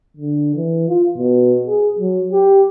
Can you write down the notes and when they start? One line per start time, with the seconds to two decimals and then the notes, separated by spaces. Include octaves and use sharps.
0.17 D3
0.55 E3
0.89 F4
1.17 B2
1.67 G#4
1.99 F#3
2.32 G4